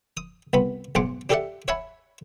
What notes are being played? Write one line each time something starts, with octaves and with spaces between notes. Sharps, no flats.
D#6
C2 B3 B5
B1 G#2 G#3 F#5 D6
D4 G4 A4 D5 E5 F#5
C#5 E5 F#5 G#5 A5 B5